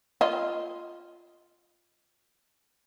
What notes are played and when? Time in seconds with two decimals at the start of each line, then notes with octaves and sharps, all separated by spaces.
0.21 F4 D#5